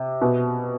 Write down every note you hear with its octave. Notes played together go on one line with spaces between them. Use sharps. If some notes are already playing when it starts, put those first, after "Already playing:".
Already playing: C3
B2